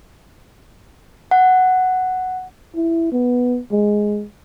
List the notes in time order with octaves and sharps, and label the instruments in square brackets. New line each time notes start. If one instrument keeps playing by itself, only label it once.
[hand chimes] F#5
[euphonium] E4
B3
G#3